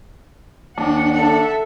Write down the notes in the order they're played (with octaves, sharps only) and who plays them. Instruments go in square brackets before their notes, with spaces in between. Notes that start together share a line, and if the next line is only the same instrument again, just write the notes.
[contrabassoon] D#2 [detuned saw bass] D4 [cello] F#5
[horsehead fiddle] A4 E5